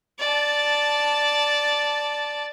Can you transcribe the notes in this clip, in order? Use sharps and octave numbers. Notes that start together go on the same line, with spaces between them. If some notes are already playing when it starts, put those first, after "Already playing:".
D5 A5